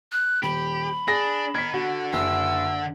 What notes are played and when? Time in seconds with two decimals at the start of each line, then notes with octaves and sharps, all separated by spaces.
0.12 F#6
0.43 D#1 G4 B5
1.08 D4 G#4 A#6
1.55 D#4 A#4 G#6 B6
1.74 D3 F#4
2.13 F#1 E6